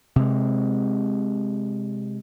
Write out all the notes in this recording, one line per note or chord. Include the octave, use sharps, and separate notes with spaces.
C3 G#3